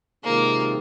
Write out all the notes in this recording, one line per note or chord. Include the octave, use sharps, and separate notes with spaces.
C3 D#3 G#3 A#3 C4 F4